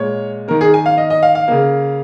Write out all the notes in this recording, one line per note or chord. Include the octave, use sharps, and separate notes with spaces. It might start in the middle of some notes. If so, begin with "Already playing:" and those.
Already playing: A#2 G#3 C#5
D#3 A#3 A#4
G#4
G#5
F5
D#5
D#5
F5
F5
C#3 A#3